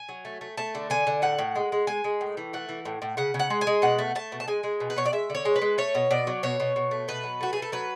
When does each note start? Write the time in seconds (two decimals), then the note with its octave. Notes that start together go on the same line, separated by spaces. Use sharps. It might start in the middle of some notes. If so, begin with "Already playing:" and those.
Already playing: G#5
0.09 F#3
0.25 A3
0.41 A3
0.57 A3 A5
0.75 D3
0.90 D3 G#5
1.07 D3
1.22 A2 F#5
1.38 A2
1.55 G#3
1.72 G#3
1.87 G#3 G#5
2.04 G#3
2.21 A2
2.37 E3
2.53 A3 F#5
2.69 E3
2.85 A2
3.02 A2
3.17 C#3 F#5
3.34 C#3
3.39 F#5
3.50 G#3
3.61 G#5
3.67 G#3
3.82 B2 F#5
3.99 A3
4.15 A3 A5
4.32 B2
4.40 A5
4.48 G#3 G#5
4.63 G#3
4.80 B2
4.90 B4
4.96 B2 C#5
5.06 D5
5.12 G#3 E5
5.30 D3 C#5
5.45 G#3
5.56 B4
5.62 G#3
5.78 A3 C#5
5.95 B2
6.11 B2 D5
6.27 F#3
6.43 B2 C#5
6.60 B2
6.76 B2
6.91 A3
7.08 B2 B4
7.24 F#3
7.41 A3 F#4
7.53 A3 G#4
7.62 A4
7.72 F#3 B4